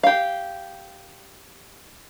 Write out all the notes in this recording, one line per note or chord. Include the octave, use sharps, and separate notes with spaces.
G4 F5